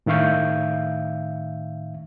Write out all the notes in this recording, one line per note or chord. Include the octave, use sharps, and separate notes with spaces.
A2 D#3 E5 F5 C#6 G6